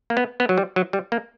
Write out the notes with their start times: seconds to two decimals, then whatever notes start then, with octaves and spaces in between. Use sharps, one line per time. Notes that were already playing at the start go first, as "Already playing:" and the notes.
0.10 A#3
0.17 B3
0.40 B3
0.49 F#3
0.58 G3
0.76 F#3
0.93 G3
1.12 A#3